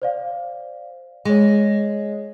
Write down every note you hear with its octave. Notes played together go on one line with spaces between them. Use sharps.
C5 D5 F5
G#3 G#4 C#5